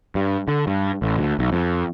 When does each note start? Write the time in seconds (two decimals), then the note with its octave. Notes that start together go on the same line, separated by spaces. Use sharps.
0.15 G2
0.48 D3
0.67 G2
1.02 A1
1.18 D2
1.39 B1
1.52 F2